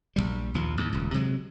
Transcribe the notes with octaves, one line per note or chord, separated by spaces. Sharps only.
A#1 D#2 G3
A#1 D#2 F3
D#2 A2
D#1 C#2
C3 F#3 G#3